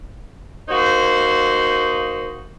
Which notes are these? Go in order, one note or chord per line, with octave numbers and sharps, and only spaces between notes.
A#3 D#4 F#4 C5